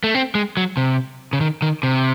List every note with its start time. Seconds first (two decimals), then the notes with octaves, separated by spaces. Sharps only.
0.04 A3
0.15 C4
0.35 G#3
0.57 F#3
0.77 C3
1.33 C#3
1.41 D#3
1.62 D#3
1.83 C3